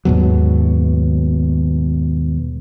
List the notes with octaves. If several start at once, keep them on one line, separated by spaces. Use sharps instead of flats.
D#2 G#2 B2 F#3